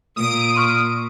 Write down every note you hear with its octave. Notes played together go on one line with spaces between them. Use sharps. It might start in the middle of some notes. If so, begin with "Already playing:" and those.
A#2 D#6 D7
C6 C#6 F6